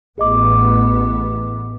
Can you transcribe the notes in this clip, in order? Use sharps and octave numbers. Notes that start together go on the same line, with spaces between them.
A1 B3 G#4 D#5 D6